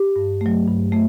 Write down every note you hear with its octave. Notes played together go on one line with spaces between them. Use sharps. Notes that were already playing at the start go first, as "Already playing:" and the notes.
Already playing: G4
G2
F#3 A3
G2
A3